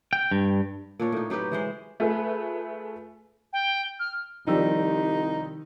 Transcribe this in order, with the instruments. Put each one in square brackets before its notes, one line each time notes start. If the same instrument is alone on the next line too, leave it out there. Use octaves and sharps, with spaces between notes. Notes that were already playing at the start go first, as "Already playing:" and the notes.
[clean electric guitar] G5
G2
[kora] A#2 D4 C#5
A2 D#4
F#3 D#4 G4 B4
E3 G#3 C5
[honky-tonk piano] A3 F4 G#4 A4 B4 E5
[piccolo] G5
F6
[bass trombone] C2 [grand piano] D#3 E6 [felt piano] F3 G3 G4 [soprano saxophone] D#4